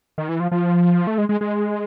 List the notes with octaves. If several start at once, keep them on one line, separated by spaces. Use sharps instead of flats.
D#3
E3
F3
F3
A3
G#3
G#3
G#3